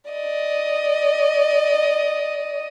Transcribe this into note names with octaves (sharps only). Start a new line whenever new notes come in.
D5 D#5